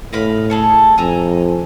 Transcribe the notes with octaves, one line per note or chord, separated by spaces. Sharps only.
A2 D#5 F5 B5
G#4 A4 C#5
F2 G#5 A#5 E6